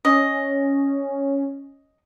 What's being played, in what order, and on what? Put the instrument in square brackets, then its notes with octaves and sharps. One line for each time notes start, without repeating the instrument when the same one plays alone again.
[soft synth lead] C#4 [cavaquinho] D#5